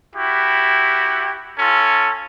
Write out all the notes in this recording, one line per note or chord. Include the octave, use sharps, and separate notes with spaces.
E4 F#4 G4
C#4 F4 A4